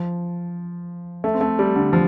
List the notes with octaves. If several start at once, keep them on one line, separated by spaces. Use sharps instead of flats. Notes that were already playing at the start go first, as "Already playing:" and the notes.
Already playing: F3
A3
C4
A3
G3
D3
F3